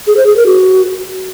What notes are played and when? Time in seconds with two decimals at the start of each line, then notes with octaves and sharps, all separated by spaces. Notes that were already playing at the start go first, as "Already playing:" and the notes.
0.07 G#4
0.17 C5
0.27 G#4
0.36 A#4
0.46 F#4